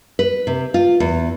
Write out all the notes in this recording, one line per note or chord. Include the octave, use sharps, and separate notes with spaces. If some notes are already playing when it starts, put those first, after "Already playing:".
B4
C3
F4
E2